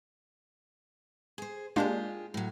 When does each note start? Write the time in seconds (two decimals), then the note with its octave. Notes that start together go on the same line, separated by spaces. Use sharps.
1.38 G#4 C5
1.76 G#3 A#3 D4 F4 G4 G#4
2.34 A2 F#3